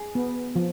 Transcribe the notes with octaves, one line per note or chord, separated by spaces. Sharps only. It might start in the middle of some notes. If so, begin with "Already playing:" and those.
Already playing: G#4
B3
F3